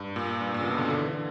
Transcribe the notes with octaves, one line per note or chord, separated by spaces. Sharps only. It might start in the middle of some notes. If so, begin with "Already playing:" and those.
Already playing: G2
A#2
G2
A#2
C#3
B2
C#3
D3
D3
E3
D3